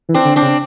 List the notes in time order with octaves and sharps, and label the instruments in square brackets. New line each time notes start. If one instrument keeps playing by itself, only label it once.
[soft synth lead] E3
[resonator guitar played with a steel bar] C4 D4
[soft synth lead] D3
[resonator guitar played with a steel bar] C4 D4
[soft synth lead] C#3